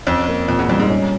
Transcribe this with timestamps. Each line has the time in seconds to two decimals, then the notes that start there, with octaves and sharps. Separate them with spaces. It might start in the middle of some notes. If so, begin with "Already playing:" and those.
0.07 F2 C#4
0.28 A#3
0.48 F2 A#2
0.59 E2
0.69 F2 G3
0.79 G#2
0.89 C#4